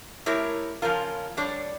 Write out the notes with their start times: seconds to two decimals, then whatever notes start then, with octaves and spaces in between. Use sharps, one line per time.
0.26 A3 E4 G4 A#4 C#5
0.82 C#3 F3 C#4 F4 A#4
1.37 G3 D4 A4 C#5